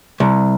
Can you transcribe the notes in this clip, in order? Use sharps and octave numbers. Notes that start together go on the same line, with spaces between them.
C2